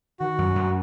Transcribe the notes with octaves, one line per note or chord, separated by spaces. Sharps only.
D#3 F#4
F#2
F#2